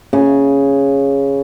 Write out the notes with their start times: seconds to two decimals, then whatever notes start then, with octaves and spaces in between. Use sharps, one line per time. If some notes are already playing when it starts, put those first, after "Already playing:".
0.13 C#3